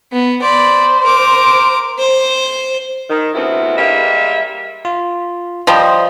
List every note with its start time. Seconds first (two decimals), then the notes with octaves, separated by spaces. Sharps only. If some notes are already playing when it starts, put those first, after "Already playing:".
0.12 B3
0.42 C5 D5 B5
1.03 A#4 D6
1.98 C5
3.10 D#3
3.35 D2 C3 B3 C4 E4
3.77 G3 G#3 A#3 E5
4.85 F4
5.67 F3 G3 C5 D#5 C6